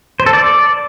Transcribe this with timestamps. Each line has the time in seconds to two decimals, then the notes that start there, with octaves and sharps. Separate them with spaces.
0.20 C5
0.26 A4
0.33 D5